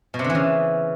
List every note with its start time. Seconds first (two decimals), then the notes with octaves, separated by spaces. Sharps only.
0.14 B2
0.19 C3
0.24 D3
0.30 E3
0.35 C#3